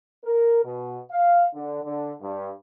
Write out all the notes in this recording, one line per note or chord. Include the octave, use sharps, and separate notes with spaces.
A#4
B2
F5
D3
D3
G2